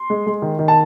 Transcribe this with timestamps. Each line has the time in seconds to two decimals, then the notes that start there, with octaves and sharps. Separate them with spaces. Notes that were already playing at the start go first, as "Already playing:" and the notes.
Already playing: C6
0.10 G#3
0.27 G#3
0.42 D#3
0.59 D#3
0.68 A5